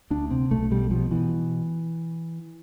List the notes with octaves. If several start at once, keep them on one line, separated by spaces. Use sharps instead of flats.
D2 D4
C3 C4
B1 A3
B2 G3
B2 F3
B2 E3